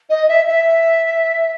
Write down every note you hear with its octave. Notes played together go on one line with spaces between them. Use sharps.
D#5
E5
E5